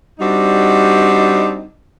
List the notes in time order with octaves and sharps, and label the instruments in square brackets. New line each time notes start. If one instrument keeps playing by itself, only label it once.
[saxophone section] G3 C4 D4 D#4 F#4